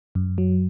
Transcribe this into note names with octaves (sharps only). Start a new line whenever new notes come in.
F#2
F#3